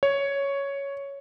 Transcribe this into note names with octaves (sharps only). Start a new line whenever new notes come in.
C#5